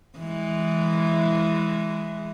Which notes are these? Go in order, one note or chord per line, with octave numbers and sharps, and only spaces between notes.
E3 G#3